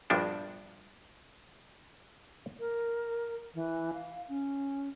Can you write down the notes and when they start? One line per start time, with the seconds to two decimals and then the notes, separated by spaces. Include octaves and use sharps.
0.10 A#1 G2 F3 B3 D4 F#4
2.59 A#4
3.54 E3
3.93 F5
4.29 C#4